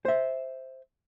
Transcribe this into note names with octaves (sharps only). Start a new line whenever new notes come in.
C5 E5